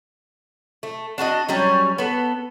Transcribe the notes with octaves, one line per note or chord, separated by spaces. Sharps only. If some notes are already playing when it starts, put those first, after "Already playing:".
A3
D4 F#4 A#4 D#5
F#3 G3 C#4 C#5
B3 A4